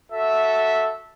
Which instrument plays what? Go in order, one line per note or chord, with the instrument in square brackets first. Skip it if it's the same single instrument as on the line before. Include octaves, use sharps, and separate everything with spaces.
[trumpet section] F#4 A4 E5